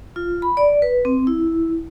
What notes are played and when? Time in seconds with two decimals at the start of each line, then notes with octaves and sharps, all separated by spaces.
0.16 F4
0.42 B5
0.57 D5
0.82 B4
1.05 C4
1.27 E4